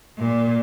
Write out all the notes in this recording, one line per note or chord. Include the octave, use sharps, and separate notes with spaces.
A#2